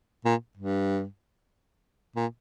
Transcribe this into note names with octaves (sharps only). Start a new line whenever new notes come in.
A#2
G2
A#2